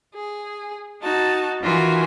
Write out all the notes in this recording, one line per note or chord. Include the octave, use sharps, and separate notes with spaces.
G#4
D#4 F#4 A5
D#3 E3 F4 F#4 G#5